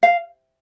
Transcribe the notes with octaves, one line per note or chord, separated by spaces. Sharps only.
F5